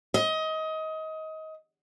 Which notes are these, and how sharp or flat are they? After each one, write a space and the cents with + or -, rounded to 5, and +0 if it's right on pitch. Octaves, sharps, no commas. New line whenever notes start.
D#5 +25